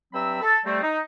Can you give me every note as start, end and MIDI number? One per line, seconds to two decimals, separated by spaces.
0.13 0.39 43
0.13 0.39 54
0.13 0.39 60
0.13 0.39 76
0.13 0.39 83
0.13 0.39 88
0.42 0.59 69
0.42 0.59 81
0.65 0.81 55
0.65 0.81 57
0.65 0.81 60
0.82 0.99 63